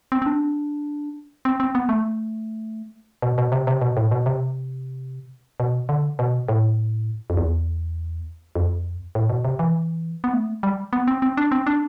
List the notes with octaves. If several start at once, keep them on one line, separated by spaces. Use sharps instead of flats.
C4
C4
D4
C4
C4
B3
A3
B2
B2
C3
C3
B2
A2
B2
C3
B2
D3
B2
A2
F2
E2
F2
A2
B2
C3
E3
B3
A3
G3
B3
C4
C4
D4
C4
D4